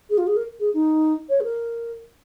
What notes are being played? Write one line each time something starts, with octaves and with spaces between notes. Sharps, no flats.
G#4
F4
G#4
A#4
G#4
D#4
C#5
G#4
A#4